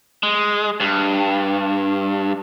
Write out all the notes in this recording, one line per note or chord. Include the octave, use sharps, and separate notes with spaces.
G#3
G2